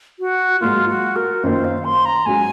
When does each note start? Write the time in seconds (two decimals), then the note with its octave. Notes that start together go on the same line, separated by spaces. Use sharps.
0.20 F#4
0.61 G#2 F#3 A#3 F4
0.89 F#4
1.16 A#4
1.43 F#2 D#3 A#3 F4 C5
1.64 F5
1.85 C6
2.05 A#5
2.26 G#2 F#3 C#4 F#4 G#5